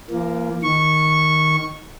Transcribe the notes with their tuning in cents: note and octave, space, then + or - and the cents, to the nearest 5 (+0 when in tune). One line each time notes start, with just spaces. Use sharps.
F3 -45 A#3 +0
D#3 +0 C#6 -10